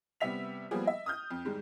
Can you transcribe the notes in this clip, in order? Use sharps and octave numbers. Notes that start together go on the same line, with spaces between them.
C3 G3 B3 E5 B6 F7
F3 G3 A#3 B3 G#4
D#5 E5
D#6 F6 G6
F2
G#2 D#3 G3 G#3